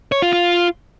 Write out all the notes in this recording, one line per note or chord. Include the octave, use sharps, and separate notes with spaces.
C#5
F4
F4